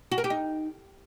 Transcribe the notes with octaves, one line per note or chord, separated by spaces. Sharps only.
F#4
A#4
G4
D#4